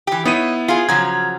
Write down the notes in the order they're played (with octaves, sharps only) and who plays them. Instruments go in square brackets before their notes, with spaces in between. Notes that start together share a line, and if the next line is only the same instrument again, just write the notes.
[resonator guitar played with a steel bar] E3 G4
[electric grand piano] B3 E4 D#7 [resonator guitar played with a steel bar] D#4 C#5
[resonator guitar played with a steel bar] F4 G#4
[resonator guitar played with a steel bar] C#3 F3 F#3 [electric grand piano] A#5 G#6